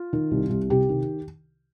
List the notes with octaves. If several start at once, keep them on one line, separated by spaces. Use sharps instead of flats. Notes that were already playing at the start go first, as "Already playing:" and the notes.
Already playing: F4
D#3
C2
C2
C3 G4
D#3